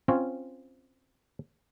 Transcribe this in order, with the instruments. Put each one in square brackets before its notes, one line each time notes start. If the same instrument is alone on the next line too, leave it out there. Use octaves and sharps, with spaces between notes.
[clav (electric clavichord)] C4 C#4 F4 C#5